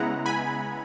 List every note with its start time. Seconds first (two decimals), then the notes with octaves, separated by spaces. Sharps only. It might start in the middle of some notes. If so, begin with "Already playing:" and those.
Already playing: C#3 G#3 B3 E4 F#5 A#5
0.26 G#5 B5